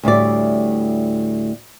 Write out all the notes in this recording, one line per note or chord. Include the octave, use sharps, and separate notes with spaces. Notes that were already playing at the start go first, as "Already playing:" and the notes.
D2 A2 G3 D5